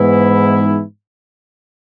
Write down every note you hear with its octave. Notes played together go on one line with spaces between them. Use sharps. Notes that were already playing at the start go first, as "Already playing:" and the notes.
Already playing: G#2 E3 B3 E4